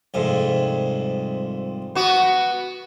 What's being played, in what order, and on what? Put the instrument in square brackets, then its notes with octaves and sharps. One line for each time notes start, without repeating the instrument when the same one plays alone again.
[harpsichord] C2 F2 G#2
[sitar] B3 F#4